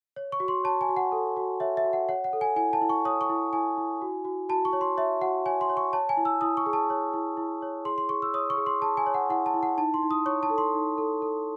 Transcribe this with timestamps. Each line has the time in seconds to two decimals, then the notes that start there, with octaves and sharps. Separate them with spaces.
0.16 C#5
0.32 C#6
0.40 F#4
0.48 C6
0.64 C#5 A5
0.81 G#5
0.89 F#4
0.96 F#5
1.12 A4
1.37 F#4
1.60 C#5 E5
1.77 E5
1.84 F#4
1.93 F#5
2.09 C#5 F#5
2.24 F#5
2.33 A4
2.41 G#5
2.56 E4 G#5
2.73 A5
2.81 E4
2.89 C#6
3.05 C#5 D#6
3.21 C#6
3.30 E4
3.53 E4 G#5
3.78 E4
4.01 F#4
4.25 F#4
4.49 F#4 A5
4.65 C#6
4.73 C#5
4.81 C6
4.97 C#5 E5
5.21 F#4 F#5
5.46 C#5 G#5
5.61 C6
5.69 C#5
5.77 C#6
5.93 C#5 A5
6.09 G#5
6.17 E4
6.25 E6
6.41 E4 D#6
6.57 C#6
6.66 G#4
6.73 A5
6.90 C#5
7.14 E4
7.37 E4
7.62 C#5
7.85 G#4 C6
7.98 C6
8.09 G#4 C#6
8.22 E6
8.34 C#5 D#6
8.50 C#6
8.57 G#4
8.66 C6
8.82 G#4 A5
8.97 G#5
9.07 C#5
9.14 F#5
9.29 E4 F#5
9.46 A5
9.54 E4
9.63 F#5
9.77 D#4 A5
9.94 C6
10.02 D#4
10.11 D#6
10.26 C#5 C#6
10.43 A5
10.50 A4
10.58 C6
10.74 D#4
10.98 A4
11.22 A4